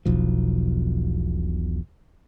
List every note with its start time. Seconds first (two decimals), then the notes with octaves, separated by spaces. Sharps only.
0.05 E1 B1 F3